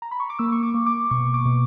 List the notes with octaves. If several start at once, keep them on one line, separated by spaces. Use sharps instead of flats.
A#5
B5
C#6
D6
A#3 E6
C#6
D6
A#3
D6
B2 C#6
D6
B2